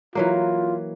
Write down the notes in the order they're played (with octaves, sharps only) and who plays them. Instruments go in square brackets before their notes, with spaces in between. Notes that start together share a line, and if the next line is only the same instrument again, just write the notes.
[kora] E3 F#3 A#3 [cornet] F4